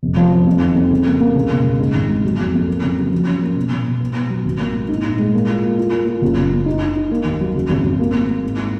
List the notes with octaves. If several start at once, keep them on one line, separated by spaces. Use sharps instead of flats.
F1
F3
F3
F2
D#3
F2
C#3
A#3
A#3
C#2
B2
C#2
G#2
G#1
G#3
F#3
F2
F2
A#3
C#3
F#3
F3
C#4
A#3
B2
B2
B2
B3
B3
F#3
G#1
A#3
G#2
D#4
A#2
G#3
A#3
F4
A#3
F4
A#3
F4
F#1
F#1
F#2
D#4
D#4
D#4
A#3
D#2
F#3
C#3
G#1
G#1
A#3
A#3
A#3
G#2